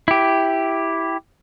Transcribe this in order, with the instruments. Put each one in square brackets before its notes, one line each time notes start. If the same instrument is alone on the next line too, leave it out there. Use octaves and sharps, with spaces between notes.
[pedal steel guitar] E4 G4